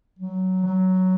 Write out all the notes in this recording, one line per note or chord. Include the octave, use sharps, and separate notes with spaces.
F#3
F#3